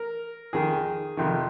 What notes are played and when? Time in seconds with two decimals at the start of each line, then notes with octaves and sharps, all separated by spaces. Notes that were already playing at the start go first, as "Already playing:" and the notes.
Already playing: A#4
0.53 F2 D#3 G#4
1.17 F2 C3 D#3